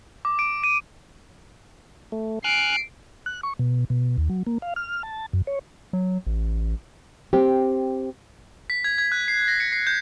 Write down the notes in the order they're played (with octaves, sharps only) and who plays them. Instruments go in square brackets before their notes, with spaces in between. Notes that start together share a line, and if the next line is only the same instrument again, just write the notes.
[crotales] D6
D7
D#7
[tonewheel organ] A3
[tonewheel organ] G#5 F6 F#6 [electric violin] C7 D7
[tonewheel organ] F#6
C#6
B2
B2
D#2
F#3
A#3
F5
F6
A5
F#2
C#5
[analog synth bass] F#3
A1
[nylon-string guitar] C4 G4
[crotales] B6
G#6
G#6
F#6
C7
A#6
C#7
C7
G6